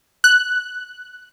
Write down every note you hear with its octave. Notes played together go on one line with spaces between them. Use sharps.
F#6